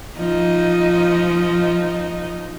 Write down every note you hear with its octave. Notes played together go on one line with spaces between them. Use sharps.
F3 D#4